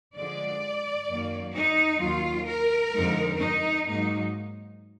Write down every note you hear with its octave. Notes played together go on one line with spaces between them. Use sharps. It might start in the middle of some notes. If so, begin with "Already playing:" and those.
D3 F3 G#3 D5
F#2 D#3 A#3
D#4
D#2 D#3 F#3 F4
A#4
F2 D3 F3 G#3 D#4
D#4
G#2 F#3 A#3 D#4